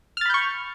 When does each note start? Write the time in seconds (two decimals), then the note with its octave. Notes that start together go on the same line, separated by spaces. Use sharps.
0.17 F6
0.21 A6
0.26 B5
0.30 G6
0.34 C#6